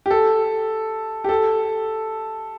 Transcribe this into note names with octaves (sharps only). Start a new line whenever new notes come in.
G4
A4
G4
A4